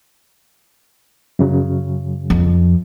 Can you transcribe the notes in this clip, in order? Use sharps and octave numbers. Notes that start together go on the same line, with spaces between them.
F#2 C#3 F#3
F2